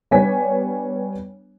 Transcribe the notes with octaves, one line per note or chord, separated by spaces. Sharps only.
G3 B3 D4 C#5 G#5 B6